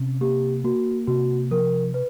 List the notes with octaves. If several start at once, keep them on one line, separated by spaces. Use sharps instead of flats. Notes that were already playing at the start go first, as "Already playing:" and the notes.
Already playing: C3 C#4
A#3 G4
A#3 F#4
C3 F#4
F3 A#4
B4